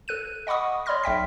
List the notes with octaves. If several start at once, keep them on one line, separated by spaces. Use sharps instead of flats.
A4 F#6 D#7
D#5 F#5 B5 C#6 D#6
C#5 D5 B5 C6 F6 A#6
B1 E5 G5 B6